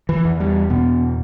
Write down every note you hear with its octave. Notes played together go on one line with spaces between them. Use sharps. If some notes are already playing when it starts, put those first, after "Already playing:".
E3
E2
G3
B2 B3